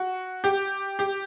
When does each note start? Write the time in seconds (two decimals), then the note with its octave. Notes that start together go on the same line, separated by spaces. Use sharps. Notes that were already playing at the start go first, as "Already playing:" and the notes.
Already playing: F#4
0.44 G4
0.99 G4